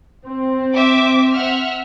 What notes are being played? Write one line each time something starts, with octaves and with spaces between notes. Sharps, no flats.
C4
E5 D6
E5 F#5 F6